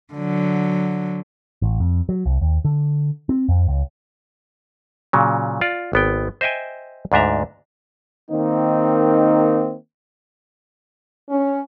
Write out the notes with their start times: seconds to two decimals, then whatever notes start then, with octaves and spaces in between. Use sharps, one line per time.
0.14 D3 F#3
1.62 A1
1.80 F2
2.09 F#3
2.26 C2
2.41 D#2
2.65 D3
3.29 C4
3.49 F2
3.68 C#2
5.13 A#2 C#3 F#3
5.61 F4 D5
5.93 G#1 B3 G5
6.41 C5 D#5 E5 G5 G#5
7.12 D2 G#2 D4 E5 A#5
8.30 D#3 A#3 C4 D#4
11.30 C#4